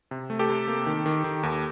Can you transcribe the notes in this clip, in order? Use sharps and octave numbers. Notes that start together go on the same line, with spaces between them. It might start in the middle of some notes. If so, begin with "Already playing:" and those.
C3
A3
G4 A4
C3
A#3
D#3
D#3
D#3
D#2